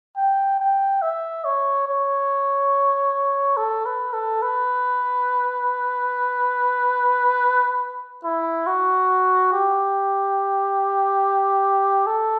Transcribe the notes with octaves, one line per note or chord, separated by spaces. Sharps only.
G5
G5
E5
C#5
C#5
A4
B4
A4
B4
E4
F#4
G4
A4